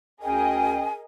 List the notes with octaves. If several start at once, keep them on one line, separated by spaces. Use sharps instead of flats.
D2 C#4 G#4 A#4 D#5 G5 G#5